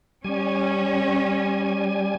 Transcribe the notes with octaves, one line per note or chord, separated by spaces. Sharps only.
G3 C#4 G#5